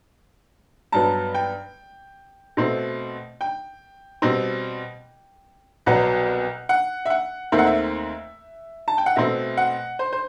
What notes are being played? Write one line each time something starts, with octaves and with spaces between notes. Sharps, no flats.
G2 F#3 B3 A5
G5
B2 A3 C4
G5
B2 G3 C4
C2 B2 F#3 B3 F#5
F#5
E5
F#5
D#2 D#3 A3 C4 E5
F#5
E5
A5
G5
F#5
B2 A3 C4 E5
F#5
C5
C5